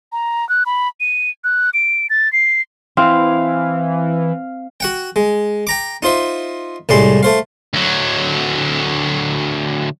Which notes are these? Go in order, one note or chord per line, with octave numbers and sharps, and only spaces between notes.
A#5
F#6
B5
D#7
F#6
D7
A6
C7
E3 C4 F5
F#4 F#5 G5
G#3
G5 A#5 D6
D#4 F4 C5 E5
C2 A2 G3 G#3 C6
A3 C5 F5
D2 F#3